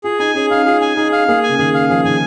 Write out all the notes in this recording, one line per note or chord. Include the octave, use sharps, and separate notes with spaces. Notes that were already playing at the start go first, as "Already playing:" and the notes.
F4 G#4
D#4 G#5
C#4 G#4
D#4 F5
F4 G#4
G#5
D#4 G#4
F5
A#3 G#4
G#5
C#3
D#3 G#4
F5
F3 G#4
D#3 G#5